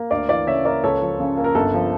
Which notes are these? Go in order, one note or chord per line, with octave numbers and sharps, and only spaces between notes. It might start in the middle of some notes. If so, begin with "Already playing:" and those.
Already playing: A#3
D2 D5 F5
E3 D5 F5
C#3 C#5 E5
A#3 A#4 D5
C#2 A4 C#5
F3
C#3
A#3
A#4
G1 A4
F3